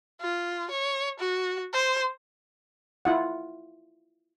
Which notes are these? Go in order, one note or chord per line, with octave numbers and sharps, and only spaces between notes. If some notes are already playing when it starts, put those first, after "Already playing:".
F4
C#5
F#4
C5
E4 F4 F#5